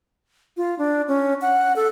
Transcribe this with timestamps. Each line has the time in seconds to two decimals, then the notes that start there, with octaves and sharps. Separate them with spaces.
0.57 F4
0.79 D4
1.08 C#4
1.42 F#5
1.76 A4